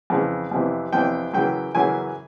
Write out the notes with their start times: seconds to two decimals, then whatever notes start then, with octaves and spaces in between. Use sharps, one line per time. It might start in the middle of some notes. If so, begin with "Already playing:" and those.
0.10 F2 C#3 E3
0.52 F2 C3 E3
0.93 F2 C3 E3 G5
1.34 F#2 C#3 E3 G5
1.75 F#2 C#3 E3 G#5